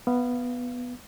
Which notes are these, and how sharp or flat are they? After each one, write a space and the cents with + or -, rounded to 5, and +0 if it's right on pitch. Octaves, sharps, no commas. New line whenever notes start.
B3 +0 F5 -20